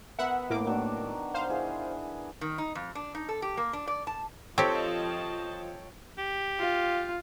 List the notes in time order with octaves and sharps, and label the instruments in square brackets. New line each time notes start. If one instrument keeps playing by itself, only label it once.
[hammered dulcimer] B3 A#4 [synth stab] E5 F#5
[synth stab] A2 A#3 D6
[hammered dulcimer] D#3 F#3 D4
[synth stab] C5 F5
[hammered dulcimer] E3 G#4
[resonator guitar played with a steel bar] D#3
D#4
F2
D4
D#4
A4
G4
A#3
D4
D5
A5
[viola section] F3 D#5 A5 [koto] C4 G4 [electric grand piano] A4 C#5 G5
[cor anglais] G4
[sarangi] F4